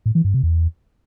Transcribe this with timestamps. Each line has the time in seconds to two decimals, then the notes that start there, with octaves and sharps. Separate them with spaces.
0.06 A2
0.15 E3
0.24 G2
0.34 C3
0.43 E2